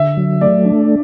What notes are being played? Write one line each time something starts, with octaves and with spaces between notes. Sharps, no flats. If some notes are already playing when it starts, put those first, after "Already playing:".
Already playing: D3 E5
F#3
A3 D5
D4